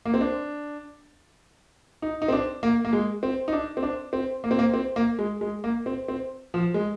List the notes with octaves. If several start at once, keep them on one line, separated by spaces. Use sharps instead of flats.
A#3
C4
D4
D#4
D#4
C4
D4
A#3
A#3
G#3
C4
D#4
D4
C4
D4
C4
A#3
C4
A#3
C4
A#3
G#3
G#3
A#3
C4
C4
F3
G#3